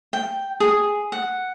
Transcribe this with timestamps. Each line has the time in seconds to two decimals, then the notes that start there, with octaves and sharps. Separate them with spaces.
0.13 G5
0.60 G#4
1.12 F#5